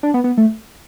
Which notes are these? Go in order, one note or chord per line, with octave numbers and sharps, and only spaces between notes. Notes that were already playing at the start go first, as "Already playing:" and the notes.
D4
B3
B3
A3